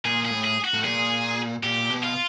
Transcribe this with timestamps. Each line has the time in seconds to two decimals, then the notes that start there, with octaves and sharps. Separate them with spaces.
0.05 A#2 G#4
0.25 G#4
0.31 A2
0.45 G#4
0.65 F#4
0.74 A2
0.84 A#2 G#4
1.63 A#2 G4
1.90 B2
2.03 F4